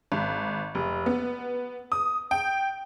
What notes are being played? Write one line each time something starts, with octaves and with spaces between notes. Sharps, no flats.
G#1
F1
B3
D#6
G5